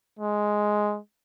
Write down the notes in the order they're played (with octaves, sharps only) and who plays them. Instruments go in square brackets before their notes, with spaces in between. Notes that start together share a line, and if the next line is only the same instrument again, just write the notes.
[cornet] G#3